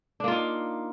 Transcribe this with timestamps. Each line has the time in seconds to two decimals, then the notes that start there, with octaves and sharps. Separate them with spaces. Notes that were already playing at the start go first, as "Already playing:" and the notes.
0.20 D4
0.24 A#3
0.28 F4
0.32 D#4